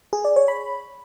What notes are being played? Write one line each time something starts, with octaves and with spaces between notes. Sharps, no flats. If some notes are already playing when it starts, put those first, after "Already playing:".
G#4
D5
C#5
B5